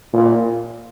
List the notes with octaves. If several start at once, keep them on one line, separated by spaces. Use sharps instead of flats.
A#2